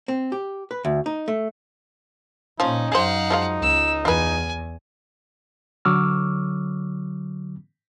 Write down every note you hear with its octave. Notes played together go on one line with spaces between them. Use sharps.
C4
G4
B4
D2
D#4
A3
A#2 F3 C#4 D#4
F#2 G#4 C5 F5 F#5
F3 G#3 F4
C#2 E6
E2 F4 B4 G#5
D3 F#3 C#6 D6 E6 F6